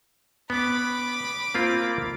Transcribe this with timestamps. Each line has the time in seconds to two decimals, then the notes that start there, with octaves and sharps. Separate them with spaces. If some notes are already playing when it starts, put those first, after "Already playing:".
0.50 B3 B5 D6
1.55 A#3 C4 F4